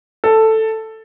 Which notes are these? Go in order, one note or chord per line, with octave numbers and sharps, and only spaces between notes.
A4